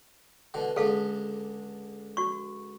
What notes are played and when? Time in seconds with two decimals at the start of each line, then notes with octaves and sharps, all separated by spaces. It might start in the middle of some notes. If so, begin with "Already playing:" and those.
0.54 B2 D3
0.76 C#2 D3 G#4 A4 F5
2.17 F#4 C#6